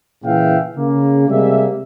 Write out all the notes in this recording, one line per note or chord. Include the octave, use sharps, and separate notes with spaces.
A#2 C#3 E3 E5 F5 G5
C#3 A#3
C3 G3 G#3 A#3 E5